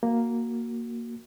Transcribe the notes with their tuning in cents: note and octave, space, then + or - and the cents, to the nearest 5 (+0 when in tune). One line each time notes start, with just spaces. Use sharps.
A#3 +0 F#4 +0